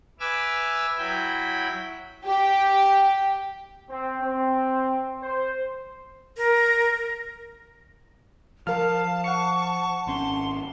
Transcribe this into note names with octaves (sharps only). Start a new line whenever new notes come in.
B4 E5 G#5 D6 E6 F6
F#3 E4 G5 B5
G4
C4
C4
C5
A#4
F3 A#4 F5 A5 F6
F#5 C#6 C#7
G#1 C#4 C6